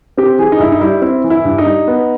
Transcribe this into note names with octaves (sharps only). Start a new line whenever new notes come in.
C4 G4
E3 G#4
D#4
G2 E4
D#4
G3 E4
C4 E4
E3
E4
G2
D#4
G3
B3